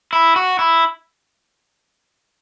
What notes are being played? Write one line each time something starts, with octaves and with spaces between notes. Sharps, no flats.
E4
F#4
E4